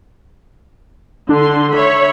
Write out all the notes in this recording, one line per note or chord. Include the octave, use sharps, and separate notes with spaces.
D3 D4 C6
C#5 E5 B5